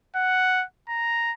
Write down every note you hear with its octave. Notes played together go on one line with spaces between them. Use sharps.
F#5
A#5